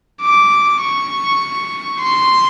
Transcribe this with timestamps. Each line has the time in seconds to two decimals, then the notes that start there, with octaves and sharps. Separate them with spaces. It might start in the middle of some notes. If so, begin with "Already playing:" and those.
0.22 D6
0.82 C#6
2.01 C6